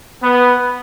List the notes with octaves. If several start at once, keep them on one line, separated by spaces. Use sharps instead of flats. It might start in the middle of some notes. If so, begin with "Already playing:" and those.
B3